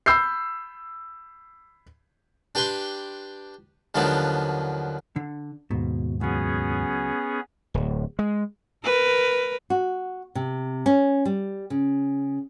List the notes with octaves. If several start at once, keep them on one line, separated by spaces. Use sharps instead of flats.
B5 E6 G6 C7
D4 G4 B4 G5 C6
D#2 D3 F3 F#3 B3 D4
D3
D#2 G#2 B2
C#2 F#3 B3 C#4 G#4
D1
G#3
A#4 B4
F#4
C3
C#4
G3
C#3